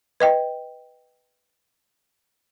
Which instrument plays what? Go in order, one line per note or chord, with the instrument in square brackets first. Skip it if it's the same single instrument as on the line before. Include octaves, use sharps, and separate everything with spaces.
[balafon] B4 D#5 G5